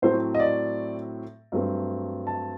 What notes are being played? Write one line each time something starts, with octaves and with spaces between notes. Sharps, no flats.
A2 F#3 A3 C4 C5
D#5
D5
G2 F#3 A3 C4
A5